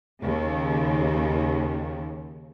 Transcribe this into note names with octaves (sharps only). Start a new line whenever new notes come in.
D#2 C#3